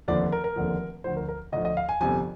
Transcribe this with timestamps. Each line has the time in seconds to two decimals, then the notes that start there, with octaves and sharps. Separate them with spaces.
0.08 F1 D#2 D3 F3 D5
0.32 A#4
0.44 A#4
0.56 F1 D#2 D3 F3
1.04 D2 D3 F3 C5
1.17 A#4
1.28 A#4
1.52 D2 D3 F3 D#5
1.65 D#5
1.77 F5
1.89 G#5
2.00 G1 F2 C3 F3 G#5